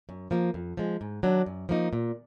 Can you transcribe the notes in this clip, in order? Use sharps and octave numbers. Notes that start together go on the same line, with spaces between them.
F#2
F3 A#3
F2
F3 G#3
G#2
D#3 F#3 D4
F#2
F3 A#3 D#4
A#2